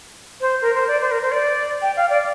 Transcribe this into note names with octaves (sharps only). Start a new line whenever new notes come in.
C5
A#4
C5
D5
C5
A#4
C5
D5
G5
F5
D5